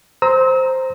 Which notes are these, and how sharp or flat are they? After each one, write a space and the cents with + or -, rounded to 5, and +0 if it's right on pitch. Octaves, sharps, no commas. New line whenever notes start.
C5 +0 A#5 +0 E6 -40